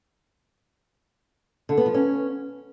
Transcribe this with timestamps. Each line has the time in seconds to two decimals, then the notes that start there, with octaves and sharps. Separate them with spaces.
1.69 D3
1.78 B3
1.86 F3
1.94 C#4